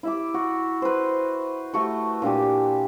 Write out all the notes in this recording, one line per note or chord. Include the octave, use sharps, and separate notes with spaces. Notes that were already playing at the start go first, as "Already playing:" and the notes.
E4 E5 D6
F#4
B4 C5
A3 F#4 C#6
A#2 D4 G4 G#5